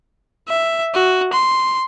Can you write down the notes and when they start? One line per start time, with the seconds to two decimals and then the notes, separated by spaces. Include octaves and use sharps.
0.48 E5
0.94 F#4
1.33 C6